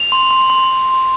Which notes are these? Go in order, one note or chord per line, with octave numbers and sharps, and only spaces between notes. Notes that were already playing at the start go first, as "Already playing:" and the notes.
Already playing: F7
C6
C6
C6